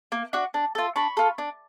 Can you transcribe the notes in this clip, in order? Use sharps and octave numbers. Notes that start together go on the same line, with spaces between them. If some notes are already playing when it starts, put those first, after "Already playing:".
A#3
D4 F#4
D4
F4 A4
D4 B5 C#6
F4 A4
D4